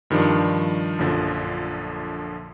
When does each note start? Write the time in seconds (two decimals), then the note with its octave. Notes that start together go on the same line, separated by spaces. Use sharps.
0.10 G2 D#3 F3 G3 D4
0.99 A#1 F#2 D3 F3 D4